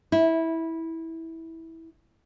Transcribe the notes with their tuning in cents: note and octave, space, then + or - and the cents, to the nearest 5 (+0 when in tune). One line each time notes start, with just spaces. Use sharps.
E4 -15